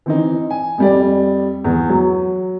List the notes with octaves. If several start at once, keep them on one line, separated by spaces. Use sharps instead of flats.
E3 C4 D#4
G#5
F2 G3 D5
E2
F#3